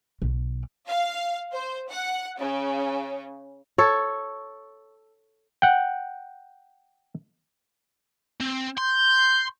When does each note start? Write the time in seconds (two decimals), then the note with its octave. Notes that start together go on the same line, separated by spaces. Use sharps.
0.22 B1
0.87 F5
1.53 C5
1.90 F#5
2.39 C#3
3.78 A4 C#5
5.62 F#5 G5
8.41 C4
8.78 C6 G6